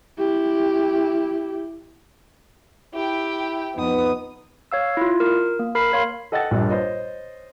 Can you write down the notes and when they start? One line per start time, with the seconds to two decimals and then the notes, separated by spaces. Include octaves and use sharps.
0.18 E4 G4
2.94 E4 G4 G5
3.76 F2 B3 D#4 B4 D#6
4.72 C#5 F5 E6
4.97 E4 F4
5.20 A#4
5.59 A#3
5.75 A#4 B5 C7
5.92 A#4 C#5 F5 C6
6.32 A4 D#5 F#5 G5 E6 A6
6.51 A#1 G2 A#2
6.70 C5 C#5 D#5